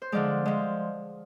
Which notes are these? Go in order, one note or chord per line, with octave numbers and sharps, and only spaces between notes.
C5
D3 F3 G#3 D5
F3 G#3